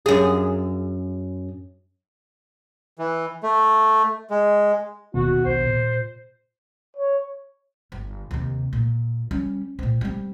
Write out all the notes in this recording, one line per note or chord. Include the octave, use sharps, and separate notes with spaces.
F#2 G#4
E3
A3
G#3
F1 D#2 B2 F#4
A#1 C5
A#2
C#5
G1
D#2 C3
A#2
G3 C#4
A#2 C4
G3 C4